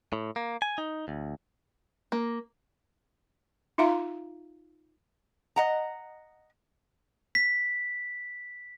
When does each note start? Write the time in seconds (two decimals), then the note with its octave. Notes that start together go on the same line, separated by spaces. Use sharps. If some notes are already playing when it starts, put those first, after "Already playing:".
0.13 A2
0.36 A#3
0.62 G#5
0.78 D#4
1.08 D2
2.12 A#3
3.78 D#4 F4 E5 F5 A#5 C6
5.56 D#5 F#5 A#5
7.35 B6